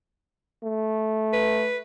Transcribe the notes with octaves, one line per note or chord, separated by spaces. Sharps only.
A3
B4